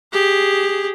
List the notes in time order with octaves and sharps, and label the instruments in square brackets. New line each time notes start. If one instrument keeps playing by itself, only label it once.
[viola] G4 G#4